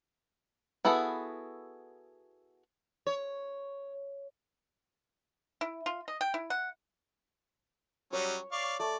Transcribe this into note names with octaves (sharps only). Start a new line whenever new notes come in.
B3 E4 F#4 G#4 A4
C#5
E4
F4
D#5
G5
E4
F#5
F#3 G3 C#4 C#5
D5 F5 C#6
A3 D5